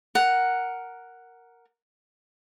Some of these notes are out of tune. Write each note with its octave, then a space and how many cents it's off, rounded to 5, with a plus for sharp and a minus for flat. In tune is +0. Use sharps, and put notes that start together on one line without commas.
A#4 +0 F#5 +0